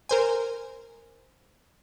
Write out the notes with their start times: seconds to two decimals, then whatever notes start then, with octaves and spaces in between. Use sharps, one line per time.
0.09 A#4 C5 G#5